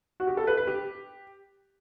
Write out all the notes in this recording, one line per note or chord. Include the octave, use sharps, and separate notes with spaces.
F#4
G4
A4
B4
B4
G4